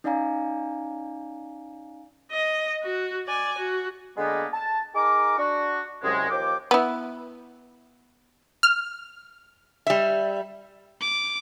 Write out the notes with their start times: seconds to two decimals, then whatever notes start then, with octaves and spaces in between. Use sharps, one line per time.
0.04 C#4 D#4 D5 F5 G#5 A#5
2.32 D#5
2.83 F#4
3.27 D5 G#5
3.58 F#4
4.17 D3 G#3 A#3 B3
4.53 A5
4.95 D#4 G#4 A#4 D6
5.37 D4 F#4
6.03 C2 F#2 G#3
6.30 D#2 F3 G5 D6
6.71 B3 E4
8.63 F6
9.87 G3 E5
11.01 D6